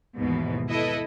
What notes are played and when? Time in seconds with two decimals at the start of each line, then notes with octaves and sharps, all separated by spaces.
0.17 D#2 G#2 B2 E3
0.69 E4 A4 B4 D#5 E5